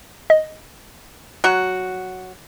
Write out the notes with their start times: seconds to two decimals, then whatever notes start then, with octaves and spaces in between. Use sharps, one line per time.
0.30 D#5
1.44 F#3 F#4